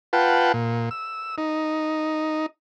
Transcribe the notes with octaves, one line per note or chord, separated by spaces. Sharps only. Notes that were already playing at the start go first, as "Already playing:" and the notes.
F4 B4 F#5 G5 A5
A#2
E6
D#4